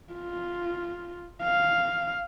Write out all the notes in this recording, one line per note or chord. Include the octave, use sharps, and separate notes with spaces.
F4
F5